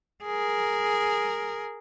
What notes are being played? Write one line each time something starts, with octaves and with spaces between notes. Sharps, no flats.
G#4 A#4